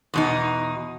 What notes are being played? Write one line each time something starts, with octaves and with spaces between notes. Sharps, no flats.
E2 B2 D#4